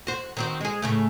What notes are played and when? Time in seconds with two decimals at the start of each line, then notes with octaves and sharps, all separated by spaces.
0.07 F#4 C5
0.37 D#3 C4 F#4
0.61 G#3 G#4
0.82 A2 C#3 A3